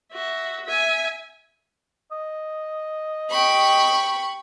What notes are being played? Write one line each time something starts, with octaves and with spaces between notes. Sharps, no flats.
F#4 E5
E5 G#5
D#5
G4 G5 B5 C#6